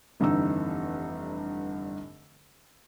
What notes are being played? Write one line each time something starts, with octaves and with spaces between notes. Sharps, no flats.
F1 G2 D3 E3 D#4 E6